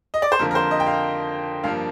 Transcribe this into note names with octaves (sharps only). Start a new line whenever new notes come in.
D#5
D5
C5
F2 D3 F3 A#3 A#4
A#4
C5
D#5
G5
F5
G2 F3 A#3 F5